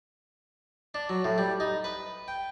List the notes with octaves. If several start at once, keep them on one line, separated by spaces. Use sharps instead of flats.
D4
F#3
A2
G3
D#4
B4
G5